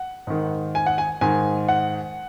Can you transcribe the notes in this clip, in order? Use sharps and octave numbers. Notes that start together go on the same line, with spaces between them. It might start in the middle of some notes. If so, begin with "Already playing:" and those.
Already playing: F#5
G#2 D#3
G#5
F#5
G#5
G#2 D#3 G#5
F#5